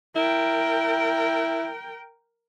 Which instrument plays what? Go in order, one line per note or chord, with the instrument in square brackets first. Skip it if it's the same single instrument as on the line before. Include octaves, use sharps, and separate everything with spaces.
[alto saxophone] E4 [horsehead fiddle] A#4 G5